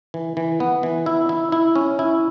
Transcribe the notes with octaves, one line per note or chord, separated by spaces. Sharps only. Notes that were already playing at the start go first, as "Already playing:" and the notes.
E3
E3
B3
E3
E4
E4
E4
C#4
E4